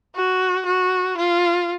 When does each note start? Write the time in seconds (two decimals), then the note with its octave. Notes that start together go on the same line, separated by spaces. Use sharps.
0.15 F#4
0.66 F#4
1.17 F4